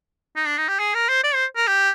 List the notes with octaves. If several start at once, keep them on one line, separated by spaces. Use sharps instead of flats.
D#4
D4
D#4
G4
G#4
A#4
C5
D5
C5
A#4
G4